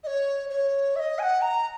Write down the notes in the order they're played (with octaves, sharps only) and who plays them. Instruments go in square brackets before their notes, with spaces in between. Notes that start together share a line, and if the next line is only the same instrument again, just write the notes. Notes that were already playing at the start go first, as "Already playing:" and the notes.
[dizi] D#5
C#5
C#5
E5
D#5
G#5
F#5
A#5